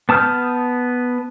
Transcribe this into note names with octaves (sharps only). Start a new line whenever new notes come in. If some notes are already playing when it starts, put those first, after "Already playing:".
B3 A5 D#6 F6 G6